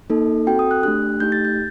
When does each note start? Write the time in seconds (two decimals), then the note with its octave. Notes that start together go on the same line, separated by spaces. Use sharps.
0.10 A#3 D#4 A4
0.47 C4 F#4 A4 G5
0.59 D#6
0.71 F#6
0.83 A3 D4 G4 F#6
1.20 A3 D#4 G4 G6
1.32 A6
1.45 G6